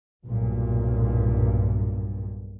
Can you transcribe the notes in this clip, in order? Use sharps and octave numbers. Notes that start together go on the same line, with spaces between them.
B1 G2 A#2